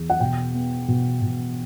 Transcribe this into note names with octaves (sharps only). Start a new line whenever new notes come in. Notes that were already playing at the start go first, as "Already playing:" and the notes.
Already playing: E2
F#5
B2 G5
B3
B2
B2